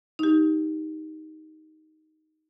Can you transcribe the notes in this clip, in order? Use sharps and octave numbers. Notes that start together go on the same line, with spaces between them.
D#4 G4